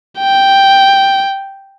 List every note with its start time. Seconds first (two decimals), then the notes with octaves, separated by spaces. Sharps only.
0.19 G5